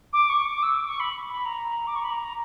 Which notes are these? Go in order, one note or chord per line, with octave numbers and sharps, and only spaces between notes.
D6
C#6
D6
E6
D6
C#6
B5
B5
A#5
D6
C#6
B5
A#5